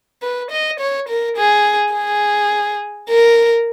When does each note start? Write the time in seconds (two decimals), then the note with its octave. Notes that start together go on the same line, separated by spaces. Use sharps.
0.22 B4
0.51 D#5
0.80 C#5
1.09 A#4
1.37 G#4
1.94 G#4
3.10 A#4